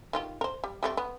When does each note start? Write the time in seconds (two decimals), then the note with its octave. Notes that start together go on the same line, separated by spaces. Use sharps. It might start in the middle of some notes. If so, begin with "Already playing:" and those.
0.13 D#3 F4 G4
0.41 A#4 C5
0.64 G3
0.83 G3 A3 C4
0.97 B3